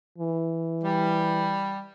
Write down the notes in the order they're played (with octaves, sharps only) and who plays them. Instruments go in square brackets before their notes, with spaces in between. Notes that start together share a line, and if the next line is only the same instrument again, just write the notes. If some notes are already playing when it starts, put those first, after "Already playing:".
[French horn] E3
[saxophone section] G3